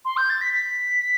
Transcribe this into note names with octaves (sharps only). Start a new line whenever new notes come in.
C6
G6
A6
B6
B6